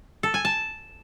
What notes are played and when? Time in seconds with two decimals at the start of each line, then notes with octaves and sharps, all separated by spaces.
0.23 A4
0.34 G#5
0.45 A5